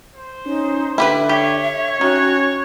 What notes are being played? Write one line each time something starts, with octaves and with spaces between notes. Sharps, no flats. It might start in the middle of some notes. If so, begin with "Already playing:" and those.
C5
C#4 D#4
D3 E4 G4 B4 E5
G4 C#5
D#3 C#4 F#4